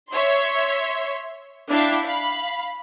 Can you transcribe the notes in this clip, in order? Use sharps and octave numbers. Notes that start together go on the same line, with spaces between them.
C#5 E5 C6
D4 E4 E5 F5 G5
F5 B5